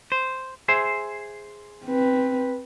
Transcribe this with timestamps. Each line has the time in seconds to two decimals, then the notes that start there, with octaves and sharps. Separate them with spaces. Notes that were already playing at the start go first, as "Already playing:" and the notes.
0.12 C5
0.68 G#4 C5 E5
1.85 C4 B4